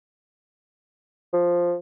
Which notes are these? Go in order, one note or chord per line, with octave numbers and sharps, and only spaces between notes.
F3